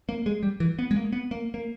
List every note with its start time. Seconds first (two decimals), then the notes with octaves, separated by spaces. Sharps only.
0.09 A#3
0.26 G#3
0.43 G3
0.60 E3
0.79 B3
0.91 G#3
0.96 A#3
1.13 B3
1.31 A#3
1.54 A#3